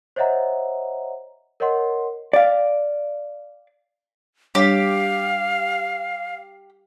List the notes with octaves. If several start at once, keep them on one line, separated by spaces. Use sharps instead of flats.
C5 C#5 D#5 E5 F#5 A#5
A#4 C#5 D#5 F#5 C6
D5 F5
G3 D4 G4 C#5 F5